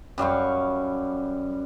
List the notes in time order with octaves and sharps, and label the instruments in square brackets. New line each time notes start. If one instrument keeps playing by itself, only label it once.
[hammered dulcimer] F#2 G3 F5 C#6